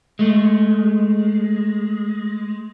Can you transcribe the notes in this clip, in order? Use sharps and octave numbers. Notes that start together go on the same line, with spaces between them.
G#3 A3